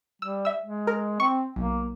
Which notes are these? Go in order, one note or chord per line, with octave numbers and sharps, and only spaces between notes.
G3 E6
E5 E6
G#3
A#4
C4 C#6
B1 A#3